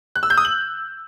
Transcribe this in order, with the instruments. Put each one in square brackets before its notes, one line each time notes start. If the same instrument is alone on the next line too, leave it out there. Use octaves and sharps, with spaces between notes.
[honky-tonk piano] F#6
E6
G6
D#6
F#7